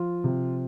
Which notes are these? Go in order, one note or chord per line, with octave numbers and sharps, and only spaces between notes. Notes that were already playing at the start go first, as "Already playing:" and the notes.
Already playing: F3 F4
C3